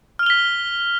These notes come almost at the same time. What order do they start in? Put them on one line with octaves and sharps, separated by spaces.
F6 F7 G7 B6